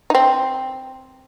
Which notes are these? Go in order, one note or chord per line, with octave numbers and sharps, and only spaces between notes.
D#4
C4